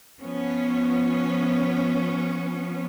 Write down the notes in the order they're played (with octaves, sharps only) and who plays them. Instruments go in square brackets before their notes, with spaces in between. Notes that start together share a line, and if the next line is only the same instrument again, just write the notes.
[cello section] F3 B3 C#4